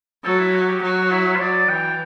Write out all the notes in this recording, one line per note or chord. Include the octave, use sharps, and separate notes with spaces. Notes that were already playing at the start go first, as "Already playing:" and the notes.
F#3 A4
E4
F#4
G4
F#3 F#4
E4
C5
F#3 D5
E3 G5